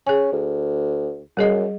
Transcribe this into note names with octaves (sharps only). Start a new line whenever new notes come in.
C#4 G#4 G#5
D2
F#2 G3 G#4 D#5